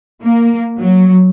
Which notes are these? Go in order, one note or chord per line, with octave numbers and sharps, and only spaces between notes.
A#3
F#3